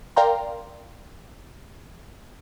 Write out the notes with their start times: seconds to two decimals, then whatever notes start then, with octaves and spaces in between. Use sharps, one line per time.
0.16 A#4 D5 F5 G5 A#5 C6